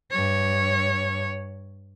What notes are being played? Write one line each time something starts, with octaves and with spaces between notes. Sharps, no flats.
G2 C#5